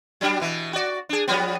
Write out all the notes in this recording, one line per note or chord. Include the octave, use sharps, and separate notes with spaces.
F#3 G3 D4
B2 E3
F#4 D5
D4 G#4
F3 G3 B3